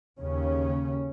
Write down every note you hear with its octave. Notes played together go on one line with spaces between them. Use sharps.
D#2 C#3 C#4